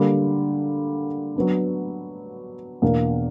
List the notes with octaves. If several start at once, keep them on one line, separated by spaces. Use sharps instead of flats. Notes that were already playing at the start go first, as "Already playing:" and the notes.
Already playing: D3 G3 A#3
F#3 B3 D4
E2 B2 A#3 D4